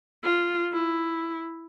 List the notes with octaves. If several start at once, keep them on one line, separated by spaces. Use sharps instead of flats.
F4
E4